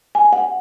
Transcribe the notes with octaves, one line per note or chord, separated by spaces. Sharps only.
G#5
F#5